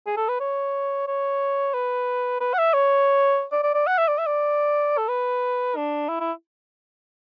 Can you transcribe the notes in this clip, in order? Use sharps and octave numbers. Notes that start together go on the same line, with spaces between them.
G#4
A4
B4
C#5
C#5
B4
B4
F#5
E5
C#5
D5
D5
D5
F#5
E5
D5
E5
D5
A4
B4
D4
E4
E4